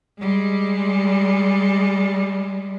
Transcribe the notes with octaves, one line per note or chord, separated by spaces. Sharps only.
G3 G#3